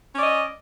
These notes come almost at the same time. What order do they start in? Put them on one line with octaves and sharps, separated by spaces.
C#4 D5 D#5